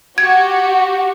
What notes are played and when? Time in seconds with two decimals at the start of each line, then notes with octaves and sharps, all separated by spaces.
0.18 F#4 G4 G#6